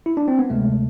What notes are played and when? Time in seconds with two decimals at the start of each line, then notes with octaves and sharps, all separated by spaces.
0.06 E4
0.17 D4
0.28 C4
0.39 B3
0.50 D2 C3 G#3 A3